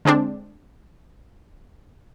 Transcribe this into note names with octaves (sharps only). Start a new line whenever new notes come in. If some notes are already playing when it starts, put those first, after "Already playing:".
D3 G#3 C4 D4